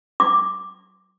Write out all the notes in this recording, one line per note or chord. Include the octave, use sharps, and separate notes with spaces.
D6